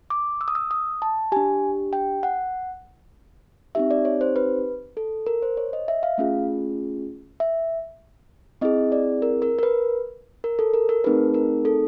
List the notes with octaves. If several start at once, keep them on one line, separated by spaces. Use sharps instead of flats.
D6
E6
D#6
E6
D#6
A5
D4 G4 G#5
G5
F#5
C4 D#4 G4 E5
D5
C#5
C5
B4
A4
A#4
C5
C#5
D#5
E5
F5
A3 C#4 F4 G#4
E5
C4 E4 G#4 D#5
D5
A#4
A#4
A#4
B4
A#4
A4
A#4
A#4
A3 C4 D#4 G#4 B4
A#4
A4